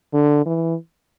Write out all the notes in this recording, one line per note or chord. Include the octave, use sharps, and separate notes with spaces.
D3
E3